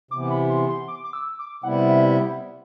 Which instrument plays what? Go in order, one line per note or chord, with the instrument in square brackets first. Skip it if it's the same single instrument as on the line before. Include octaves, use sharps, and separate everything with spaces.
[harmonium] C3 E3 B3 [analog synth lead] D6
[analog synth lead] B5
C6
C6
D6
D6
E6
D6
[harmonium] C3 G3 B3 E4 [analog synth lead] F#5
[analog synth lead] E5